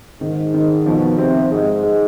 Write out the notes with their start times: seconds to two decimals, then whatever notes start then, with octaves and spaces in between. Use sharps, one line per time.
0.21 G#2 D#3
0.54 D#3
0.86 B2 F3
1.18 C3 C4
1.51 G#2 G#3
1.83 G#3